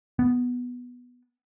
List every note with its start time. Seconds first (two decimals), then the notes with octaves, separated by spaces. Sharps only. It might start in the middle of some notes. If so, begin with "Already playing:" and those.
0.19 B3